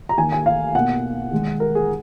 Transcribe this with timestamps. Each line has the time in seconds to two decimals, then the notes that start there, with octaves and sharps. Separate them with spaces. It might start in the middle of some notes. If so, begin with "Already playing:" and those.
0.09 A#5
0.18 D#3 A#3 G#5
0.32 G#5
0.46 F5
0.75 B2 A#3 F#5
1.31 D#3 G#3
1.60 A#4
1.75 G#4